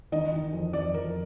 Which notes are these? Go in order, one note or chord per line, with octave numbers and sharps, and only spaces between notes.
D#3 D#5
D#3
F2
F2 D5
F2 A#4